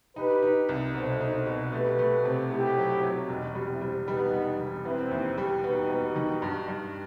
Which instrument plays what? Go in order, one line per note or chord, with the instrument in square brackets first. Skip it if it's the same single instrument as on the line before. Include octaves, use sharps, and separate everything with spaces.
[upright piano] D#4 [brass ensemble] G4 B4
[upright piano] D#4
C2
[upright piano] B2 [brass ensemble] A4 C5
[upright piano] D#4
B2
[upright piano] A3 [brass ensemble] G4 B4
[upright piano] A3
C3
[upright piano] A3 [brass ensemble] E4 G4
[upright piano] F#3
F#3
[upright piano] E1 [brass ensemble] D#4 F#4
[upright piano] G3
[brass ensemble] C4 E4
[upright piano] G3
[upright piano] G3 [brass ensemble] B3 D#4
[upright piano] E1
E1
[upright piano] B3 [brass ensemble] C4 E4
[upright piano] D#2
G3
[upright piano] B3 [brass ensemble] D#4 F#4
[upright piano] B3
D#3
G2
G2